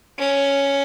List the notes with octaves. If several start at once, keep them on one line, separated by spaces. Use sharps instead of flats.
C#4